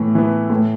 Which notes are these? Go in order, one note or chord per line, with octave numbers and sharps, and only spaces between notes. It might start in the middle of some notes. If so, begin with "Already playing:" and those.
Already playing: A2 E3 B3
E3 B3
A2